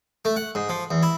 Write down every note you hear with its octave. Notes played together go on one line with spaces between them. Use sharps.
A3
F#5
G#2
F3
E2
E4